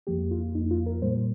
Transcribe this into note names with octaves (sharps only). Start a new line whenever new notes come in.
F2 F3 A#3 G4
F4
F2 F3 A#3 D#4
F4
A#4
A#2 G3 A#3 C5